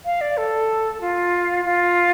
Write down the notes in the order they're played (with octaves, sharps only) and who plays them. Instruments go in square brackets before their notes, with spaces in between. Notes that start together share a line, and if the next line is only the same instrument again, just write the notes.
[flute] F5
D5
A4
F4
F4